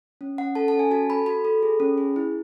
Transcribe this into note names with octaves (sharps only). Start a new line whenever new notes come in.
C#4
C#4 F#5
A4 A5
A5
C#4
G#5
F#4 A5
A4 B5
F#4 B5
A4
G#4
C#4
G#4
E4